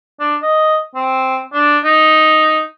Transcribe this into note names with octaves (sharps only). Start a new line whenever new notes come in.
D4
D#5
C4
D4
D#4